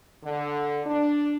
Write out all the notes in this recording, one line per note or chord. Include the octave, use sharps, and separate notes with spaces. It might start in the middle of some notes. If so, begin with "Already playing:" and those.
D3
D4